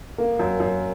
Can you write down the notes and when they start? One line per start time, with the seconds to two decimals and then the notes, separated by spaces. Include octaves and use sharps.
0.18 A#3
0.39 F#2
0.60 F#2